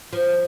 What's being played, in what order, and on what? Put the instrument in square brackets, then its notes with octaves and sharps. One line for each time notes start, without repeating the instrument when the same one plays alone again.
[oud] F3